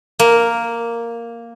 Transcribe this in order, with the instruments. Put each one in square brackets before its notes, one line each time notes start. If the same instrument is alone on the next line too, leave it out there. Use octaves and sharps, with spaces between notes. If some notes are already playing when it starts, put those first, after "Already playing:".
[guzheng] A#3